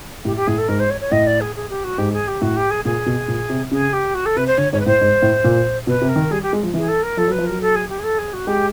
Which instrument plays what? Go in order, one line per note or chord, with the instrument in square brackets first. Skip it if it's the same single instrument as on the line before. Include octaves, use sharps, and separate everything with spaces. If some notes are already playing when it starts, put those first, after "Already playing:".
[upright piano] A2 [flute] G4
[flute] G4
[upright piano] A2 [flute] G#4
[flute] A4
[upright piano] G#2 [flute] A#4
[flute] C5
C#5
C#5
[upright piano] A2 [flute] D#5
[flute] D5
G#4
G#4
G4
F#4
[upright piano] G#2 [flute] G4
[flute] G#4
G4
[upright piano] A2 [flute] F#4
[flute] G4
G#4
[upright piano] A#2 [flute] G#4
[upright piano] B2
A#2
C3
[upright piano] C#3 [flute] G#4
[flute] G4
F#4
A4
[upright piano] C3 [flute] B4
[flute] C5
[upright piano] D3 [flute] C#5
[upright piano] G#2 [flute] C#5
[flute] B4
[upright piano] A2 [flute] C5
[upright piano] G#2
A2
A#2
[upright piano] B2 [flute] B4
[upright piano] C3
[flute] A#4
[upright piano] D#3
[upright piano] G3 [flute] G#4
[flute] G4
[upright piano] G#3
F3
[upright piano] E3 [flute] G#4
[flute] A4
A#4
[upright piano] F3 [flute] A4
[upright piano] F#3
[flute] B4
[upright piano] F3
[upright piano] F#3 [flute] A#4
[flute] A4
G#4
G4
G#4
A4
G#4
F#4
[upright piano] G#3 [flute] G4